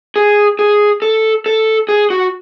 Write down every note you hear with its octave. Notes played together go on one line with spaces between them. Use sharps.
G#4
G#4
A4
A4
G#4
F#4